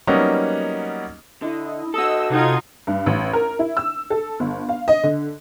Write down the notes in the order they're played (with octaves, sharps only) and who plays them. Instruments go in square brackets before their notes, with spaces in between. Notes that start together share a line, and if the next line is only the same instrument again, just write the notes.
[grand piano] F#3 G3 A#3 B3 C#4 D#4
[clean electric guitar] D3 [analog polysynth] E4 D#5
[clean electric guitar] F#4 A4 [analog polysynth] D#5 E6
[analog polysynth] C3 F#5 G#6 [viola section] D#4 F4
[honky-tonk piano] G2
A1
A#4
E4
E6
A4
G1
F5
D#5
D3